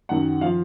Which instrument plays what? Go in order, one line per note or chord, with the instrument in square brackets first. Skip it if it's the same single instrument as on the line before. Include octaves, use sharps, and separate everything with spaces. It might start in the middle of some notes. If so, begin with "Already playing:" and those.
[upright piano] F#2 D#3 F#5
F3 F5